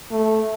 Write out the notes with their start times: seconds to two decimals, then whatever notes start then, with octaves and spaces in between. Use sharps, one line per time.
0.11 A3